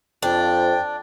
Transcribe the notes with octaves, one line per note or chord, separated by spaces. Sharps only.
F2 D4 G5